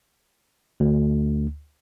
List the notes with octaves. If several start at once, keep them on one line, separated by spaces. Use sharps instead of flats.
D2